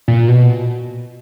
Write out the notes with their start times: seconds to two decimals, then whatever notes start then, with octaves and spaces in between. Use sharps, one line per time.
0.08 A#2
0.28 B2